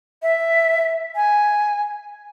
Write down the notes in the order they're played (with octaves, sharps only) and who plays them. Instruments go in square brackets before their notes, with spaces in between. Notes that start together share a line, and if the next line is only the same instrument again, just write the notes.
[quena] E5
G#5